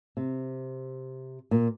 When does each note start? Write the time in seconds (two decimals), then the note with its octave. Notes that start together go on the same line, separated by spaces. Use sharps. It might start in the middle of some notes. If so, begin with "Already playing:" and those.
0.17 C3
1.51 A#2